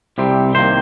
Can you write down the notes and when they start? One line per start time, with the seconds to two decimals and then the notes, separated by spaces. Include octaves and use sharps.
0.18 C2 C3 G3 C4
0.54 C2 C3 D#3 A#3 C5